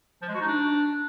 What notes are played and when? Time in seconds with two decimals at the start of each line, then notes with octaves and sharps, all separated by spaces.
0.22 F3
0.28 G#3
0.35 F#4
0.41 D#4
0.47 D4